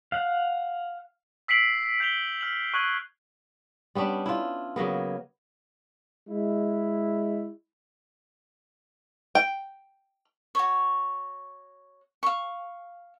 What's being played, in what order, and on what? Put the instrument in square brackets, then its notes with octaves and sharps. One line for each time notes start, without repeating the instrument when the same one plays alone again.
[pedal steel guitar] F5 F#5
[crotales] E6 B6 C7 D7 F#7
G6 B6 F7 G7
F6 F#7
C#6 F#6 G#6 F#7
[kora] G3 B3 C#4 D4
E4 F4
C#3 F#3 A#3 B3
[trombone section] G#3 E4
[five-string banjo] G5
[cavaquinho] F#4 C#5
F5 C#6